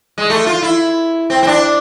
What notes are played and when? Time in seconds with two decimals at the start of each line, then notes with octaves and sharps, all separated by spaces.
0.18 G#3
0.30 A3
0.46 F4
0.62 E4
1.30 C4
1.43 C4
1.47 D4